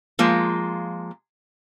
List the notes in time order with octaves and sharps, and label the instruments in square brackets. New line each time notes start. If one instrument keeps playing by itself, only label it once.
[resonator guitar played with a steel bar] F3 G#3 A#3 F4